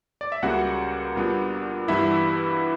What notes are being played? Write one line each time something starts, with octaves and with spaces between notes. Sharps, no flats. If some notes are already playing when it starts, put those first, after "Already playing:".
D5
E5
C#2 C#3 G3 A#3 F#4 F#5
A#2 G3 B3 D4
G2 E3 G3 B3 E4 E5